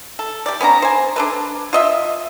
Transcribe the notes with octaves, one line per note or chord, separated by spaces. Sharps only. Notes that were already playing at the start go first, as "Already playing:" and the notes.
A4
G3 D5
B3 C#4 D4 A#5
C5 G#5
D4 A4 B4
F4 D#5 E5